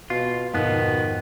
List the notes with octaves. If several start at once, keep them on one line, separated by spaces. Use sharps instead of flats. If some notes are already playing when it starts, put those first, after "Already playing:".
B2 F4
F2 G#2 B2 D#3 B3